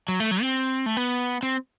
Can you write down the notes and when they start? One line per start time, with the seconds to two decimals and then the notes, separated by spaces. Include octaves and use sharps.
0.08 F#3
0.20 A3
0.31 F#3
0.42 C4
0.86 A3
0.97 B3
1.43 C4